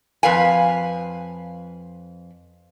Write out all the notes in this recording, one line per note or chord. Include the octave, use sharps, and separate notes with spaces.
F2 B4 F5 G#5